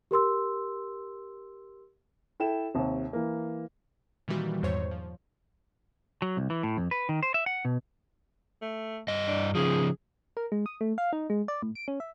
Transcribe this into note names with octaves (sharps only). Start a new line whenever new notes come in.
G4 A#4 C6 E6
E4 A4 G5 E7
D#2 C3
E3 A#3
A#2 D#3 E3 G3 F#4
E2 G#2 C5 C#5
F3
F#3
C2
E3
A2
F2
B4
D#3
C5
E5
F#5
B2
A3
G2 D#5
D4
C#3 F3 G#4
A#4
G#3
D#6
A3
F5
D#4
G#3
D5
A2
D7
C#4
E5